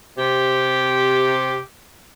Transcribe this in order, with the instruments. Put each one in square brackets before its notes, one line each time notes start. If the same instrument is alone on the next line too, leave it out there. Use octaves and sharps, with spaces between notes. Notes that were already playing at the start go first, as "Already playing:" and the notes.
[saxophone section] C3 G4